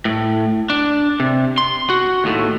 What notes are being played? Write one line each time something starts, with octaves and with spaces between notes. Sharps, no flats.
A2
D4
C3
C6
F#4
D#2 A2